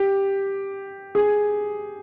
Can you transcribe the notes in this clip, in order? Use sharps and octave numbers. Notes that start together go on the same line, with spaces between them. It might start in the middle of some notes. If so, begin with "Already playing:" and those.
Already playing: G4
G#4